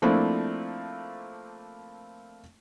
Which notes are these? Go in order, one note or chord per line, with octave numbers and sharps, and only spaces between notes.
F3 A3 A#3 C4 D4 E4